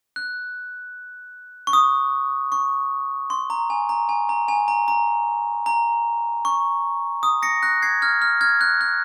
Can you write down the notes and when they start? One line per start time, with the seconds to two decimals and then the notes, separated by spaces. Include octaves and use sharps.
0.16 F#6
1.67 C#6
1.73 D#6
2.52 C#6
3.30 C6
3.50 A#5
3.70 G#5
3.89 A#5
4.09 G#5
4.29 A#5
4.48 G#5
4.68 A#5
4.88 A#5
5.66 A#5
6.45 C#6
7.23 D#6
7.43 A#6 C#7
7.63 F#6 A#6
7.82 G#6 C7
8.02 F6 G#6
8.22 F6
8.41 F6 G#6
8.61 F#6
8.81 F#6